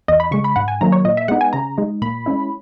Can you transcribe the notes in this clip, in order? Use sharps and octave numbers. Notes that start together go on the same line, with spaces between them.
E2 D#5
B5
C#3 G#3 C#6
B5
G#2 F#5
G#5
D#3 F#3 A#3 A#5
C#5
A#2 D#5
E5
G#3 B3 D#4 F#5
G#5
C#3 A#5
G#3 D#4
A#2 B5
G#3 C#4 E4